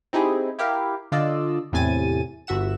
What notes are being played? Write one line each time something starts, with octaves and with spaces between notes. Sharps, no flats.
C4 D#4 E4 G4 G#4
E4 G4 A#4 F5
D3 F4 D5 D#5 E6
E2 A2 C3 G#5 A6 D#7
G1 F#4 E5 F#5 E7